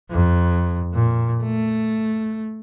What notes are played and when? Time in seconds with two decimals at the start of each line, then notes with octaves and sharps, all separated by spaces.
0.11 F2
0.94 A#2
1.43 A3